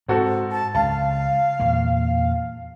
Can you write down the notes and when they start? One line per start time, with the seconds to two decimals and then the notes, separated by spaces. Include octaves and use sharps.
0.08 G#2 C4 F#4 A4
0.52 A5
0.75 C#2 F5 A5
1.59 E2 A#2 A#3